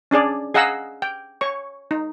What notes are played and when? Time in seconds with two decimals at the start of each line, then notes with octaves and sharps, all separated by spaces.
0.11 C#4 D4 G#4 D5
0.54 G#4 D#5 F5 F#5 A#5 E6
1.02 G5
1.41 C#5 C#6
1.91 D#4